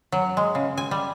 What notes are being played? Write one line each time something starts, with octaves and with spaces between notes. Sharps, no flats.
F#3
G#3
C#3
G#5
G3